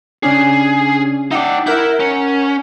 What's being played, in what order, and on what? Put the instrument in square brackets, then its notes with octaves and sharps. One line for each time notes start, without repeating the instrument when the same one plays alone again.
[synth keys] C#3 C#4 D4 [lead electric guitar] G#4
[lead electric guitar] D#4 D5 [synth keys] E5 F#5 G5
[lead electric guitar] E4 E5 [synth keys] A#4 F#5 G6
[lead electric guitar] C#4